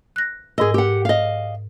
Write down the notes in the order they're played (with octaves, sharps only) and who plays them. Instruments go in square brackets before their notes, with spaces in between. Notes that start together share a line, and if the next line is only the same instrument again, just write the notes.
[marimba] F#6 A#6
[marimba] G#2 A#4 E6 [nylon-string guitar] G#4 D#5
[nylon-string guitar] G4 F#5
D#5 F5